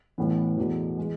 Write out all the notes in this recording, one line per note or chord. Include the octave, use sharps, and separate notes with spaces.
A1 A2 E3 B3
E2 B2 A3
E3 G#3